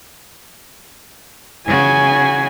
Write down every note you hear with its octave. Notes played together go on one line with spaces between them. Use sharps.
C#3 F#4 G#5